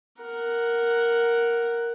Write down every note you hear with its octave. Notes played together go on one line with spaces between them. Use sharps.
A#4 F#5